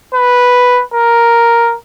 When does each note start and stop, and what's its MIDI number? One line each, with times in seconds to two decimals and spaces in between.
0.14 0.82 71
0.94 1.75 70